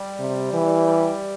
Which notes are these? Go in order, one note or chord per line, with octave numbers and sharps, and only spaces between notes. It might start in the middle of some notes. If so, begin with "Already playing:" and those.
Already playing: G3
C3
E3
G3